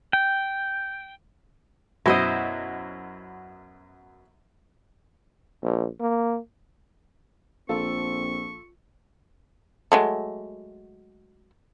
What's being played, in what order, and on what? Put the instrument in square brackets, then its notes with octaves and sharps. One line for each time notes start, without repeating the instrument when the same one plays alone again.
[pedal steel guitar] G5
[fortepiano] F#2 B2 [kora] E4 C5 D#5
[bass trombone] A#1
A#3
[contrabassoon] A#1 [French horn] C4 [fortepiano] F4 A4 [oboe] C#6
[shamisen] F#3 G#3 A3